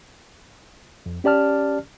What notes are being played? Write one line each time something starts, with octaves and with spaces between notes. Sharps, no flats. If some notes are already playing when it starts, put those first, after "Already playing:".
F2
C#4 G4 D5 A5 F6